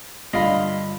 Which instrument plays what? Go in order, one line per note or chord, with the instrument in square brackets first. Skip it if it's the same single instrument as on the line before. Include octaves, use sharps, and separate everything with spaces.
[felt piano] G2 D3 [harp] F4 B5 [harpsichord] D#5 F5